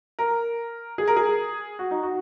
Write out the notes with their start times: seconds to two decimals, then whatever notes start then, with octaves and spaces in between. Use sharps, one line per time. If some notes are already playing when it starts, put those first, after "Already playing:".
0.19 A#4
0.98 G#4
1.08 A#4
1.16 G#4
1.79 F#4
1.91 D#4
2.03 F#4